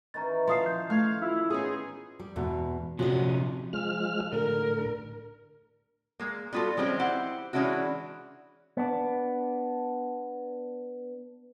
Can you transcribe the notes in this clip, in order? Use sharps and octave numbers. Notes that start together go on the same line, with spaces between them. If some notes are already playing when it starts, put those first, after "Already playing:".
D#3 E3 C#4 A#5 A6
F3 F5 A5 C6 D#6 C7
G6
A3 F5 C6 C#6 G#6
E4 F4 E6
B3 C#4 D#4 G#4 C5 G5
G3
E2 G#2 B2
C3 F3 C#4 F#4 D#5
F3 G#3 F6
A2 D3 A#4
G#3 A#3
G3 B3 F4 F#4 A4
F3 G3 G#3 C4 C#4 G4
E4 G4 C5 F#5
E3 G#3 C#4 D4 E4 F#4
B3 D4